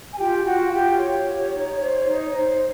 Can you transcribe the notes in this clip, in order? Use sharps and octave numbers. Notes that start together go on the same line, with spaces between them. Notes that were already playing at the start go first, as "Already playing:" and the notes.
G#5
F4 G4 G5
F4 F#4 F#5
F4 G4 G5
G4 C#5
G4
D#4
C5
D#4
C5